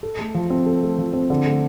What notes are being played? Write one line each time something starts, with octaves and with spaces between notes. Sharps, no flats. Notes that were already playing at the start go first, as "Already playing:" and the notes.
A4
A3
F3
C4
A4
A3
F3
C4
D3
A3